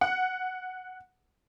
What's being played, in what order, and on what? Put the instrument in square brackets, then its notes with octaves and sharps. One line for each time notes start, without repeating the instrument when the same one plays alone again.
[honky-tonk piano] F#5